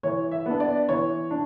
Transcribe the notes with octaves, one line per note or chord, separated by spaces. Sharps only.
E3 C#5
E5
B3 D4
D5
E3 C#5
D4